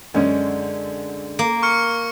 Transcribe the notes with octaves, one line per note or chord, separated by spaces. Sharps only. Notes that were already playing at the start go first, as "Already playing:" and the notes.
F#2 D3 G#3 C#4 D#5
A#3
C#6 F6 C#7